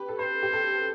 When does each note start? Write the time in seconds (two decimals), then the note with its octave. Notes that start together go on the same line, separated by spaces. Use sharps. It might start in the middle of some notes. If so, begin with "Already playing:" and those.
Already playing: G4 B4
0.08 A4
0.19 B4 C5
0.43 G4
0.53 A4